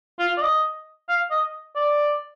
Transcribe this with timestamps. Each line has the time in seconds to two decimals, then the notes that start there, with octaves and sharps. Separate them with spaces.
0.20 F4
0.37 D5
0.42 D#5
1.09 F5
1.31 D#5
1.76 D5